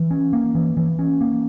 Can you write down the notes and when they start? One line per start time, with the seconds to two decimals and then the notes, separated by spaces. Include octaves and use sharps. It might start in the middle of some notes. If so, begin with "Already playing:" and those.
Already playing: E3
0.11 C#4
0.33 A#3
0.55 E3
0.77 E3
0.99 C#4
1.21 A#3